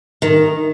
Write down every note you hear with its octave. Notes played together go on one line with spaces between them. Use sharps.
D#3